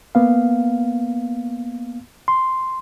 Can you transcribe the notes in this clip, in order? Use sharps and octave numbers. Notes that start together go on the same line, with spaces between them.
A#3 B3 F5
C6